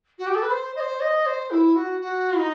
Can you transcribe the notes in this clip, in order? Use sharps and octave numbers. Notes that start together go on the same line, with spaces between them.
F#4
G4
A4
B4
C5
D#5
C5
D#5
C5
E4
F#4
F#4
D#4